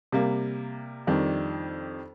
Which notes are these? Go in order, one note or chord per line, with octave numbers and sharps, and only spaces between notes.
C3 G3 A#3
F2 D#3 G3 D4